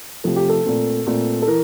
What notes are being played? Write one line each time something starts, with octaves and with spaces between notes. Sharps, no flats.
C3 F3 A3 A4
G4
A4
A#2 A3 C4
A#2 A3 C4
A4
E3 A#4